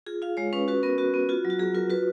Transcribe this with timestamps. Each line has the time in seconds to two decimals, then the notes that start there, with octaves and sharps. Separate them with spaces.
0.06 F4 G#4
0.22 F4 F5
0.37 G#3 C#5
0.53 C#4 B4
0.68 F#4 B4
0.83 B3 A#4
0.98 B3 F#4
1.14 B3
1.29 F4 F#4
1.45 F#3
1.50 F#4
1.59 F#3 G#4
1.75 F4 A#4
1.90 F#4 B4